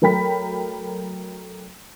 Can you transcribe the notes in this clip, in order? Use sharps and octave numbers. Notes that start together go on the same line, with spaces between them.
F#3 A3 A#4 G5 B5 B6